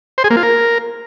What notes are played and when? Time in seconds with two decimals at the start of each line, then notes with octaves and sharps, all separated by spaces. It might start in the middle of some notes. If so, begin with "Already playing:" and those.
0.18 C5
0.24 G#4
0.30 A#3
0.37 F4
0.43 A#4